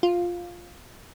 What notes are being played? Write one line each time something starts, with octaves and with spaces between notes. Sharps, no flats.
F4